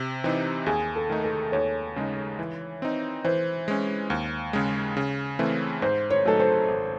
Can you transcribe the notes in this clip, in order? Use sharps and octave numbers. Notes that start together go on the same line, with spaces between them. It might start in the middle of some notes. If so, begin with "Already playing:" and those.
Already playing: C3
E3 C4 D#4
D#2 G#4
A4
D#3 A3 D#4
A4
D#2 C#5
C#3 G#3 D#4
E3
C4 D#4
E3 C5
G#3 C#4
D#2
C#3 G#3
C#3
E3 A3 C4
G#2 C5
C#5
F#3 A3 D#4 A4
C5
G#1